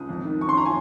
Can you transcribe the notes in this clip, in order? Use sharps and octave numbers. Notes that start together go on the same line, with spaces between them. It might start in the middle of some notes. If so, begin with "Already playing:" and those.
Already playing: C#2 D#6
F2
D#3
F#2 C#6
C6
F3 A#5
G#5